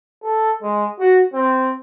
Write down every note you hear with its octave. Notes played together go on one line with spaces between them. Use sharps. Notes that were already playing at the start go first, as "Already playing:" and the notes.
A4
G#3
F#4
C4